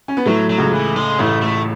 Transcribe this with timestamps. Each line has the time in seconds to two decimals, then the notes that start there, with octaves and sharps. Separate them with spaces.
0.08 C#4
0.17 B3
0.26 A2 F#3 A3
0.50 F#3
0.57 C#2 C#3
0.72 E3
0.96 G#3
1.19 A1 A2 A3
1.42 A3